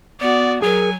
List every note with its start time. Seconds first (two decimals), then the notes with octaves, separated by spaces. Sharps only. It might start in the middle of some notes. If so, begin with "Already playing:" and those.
0.20 B3 F#4 D5
0.62 F#3 G#4 A#4 G#5